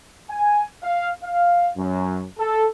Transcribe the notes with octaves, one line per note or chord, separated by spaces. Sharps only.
G#5
F5
F5
F#2
A4